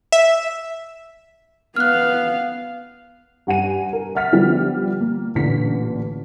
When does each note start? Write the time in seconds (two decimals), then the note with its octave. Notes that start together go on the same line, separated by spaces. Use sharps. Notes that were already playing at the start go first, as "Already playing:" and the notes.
0.12 E5
1.76 B3 F5 F6 F#6
3.47 G2 F#5 G#5 D#7
3.93 A#4
4.15 E5 F#5 F6 A6 B6
4.32 D3 F3 G3 B3
5.01 A#3
5.35 A1 A#2 D3 B6